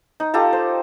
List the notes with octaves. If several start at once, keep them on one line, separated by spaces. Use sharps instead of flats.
D#4
F4 G4 A4 A#5
C5